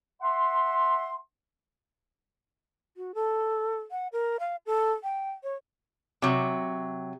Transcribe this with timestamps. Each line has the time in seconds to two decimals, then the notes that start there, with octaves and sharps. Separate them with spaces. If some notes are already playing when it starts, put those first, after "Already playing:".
0.22 E5 F#5 C6
2.97 F#4
3.14 A4
3.91 F#5
4.12 A#4
4.40 F5
4.66 A4
5.03 G5
5.43 C#5
6.22 C3 F#3